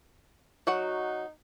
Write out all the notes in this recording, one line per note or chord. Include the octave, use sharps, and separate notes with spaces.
F#3 D#4 F#4 F#5